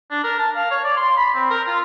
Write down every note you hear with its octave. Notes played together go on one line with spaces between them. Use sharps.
D4
A#4
A5
F5
C#5
D5
C6
B5
C4
A#4
F4